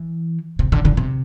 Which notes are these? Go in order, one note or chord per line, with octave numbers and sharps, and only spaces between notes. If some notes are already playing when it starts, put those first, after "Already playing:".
Already playing: E3
C3
D3
D3
C3